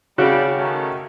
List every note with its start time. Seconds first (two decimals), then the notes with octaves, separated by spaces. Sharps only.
0.18 C#3 G3 F#4 G4 D5
0.59 D#3 A3 C#4